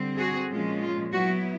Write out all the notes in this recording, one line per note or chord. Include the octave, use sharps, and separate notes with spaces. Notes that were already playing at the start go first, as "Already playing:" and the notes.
Already playing: D3 G3 C4
F#4 G#4
A#2 F3 G#3 C#4 F4
F4
F#3 B3 E4 F#4